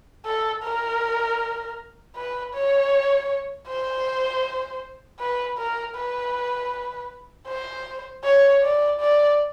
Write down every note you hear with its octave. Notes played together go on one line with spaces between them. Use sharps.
A4
A#4
B4
C#5
C5
B4
A#4
B4
C5
C#5
D5
D5